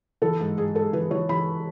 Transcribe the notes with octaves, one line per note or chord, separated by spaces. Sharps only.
E3 A4
G#2
G#2 G#4
G#2 A4
E3 B4
E3 C#5
E3 B5